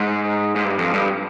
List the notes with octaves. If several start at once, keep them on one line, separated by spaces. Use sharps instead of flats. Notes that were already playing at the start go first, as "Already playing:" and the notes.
Already playing: G#2
G#2
G2
F2
G2